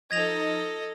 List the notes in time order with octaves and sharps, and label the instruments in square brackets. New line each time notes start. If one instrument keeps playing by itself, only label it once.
[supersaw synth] F3 D#4 [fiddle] A4 D#5 [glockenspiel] G#6 A#6 F7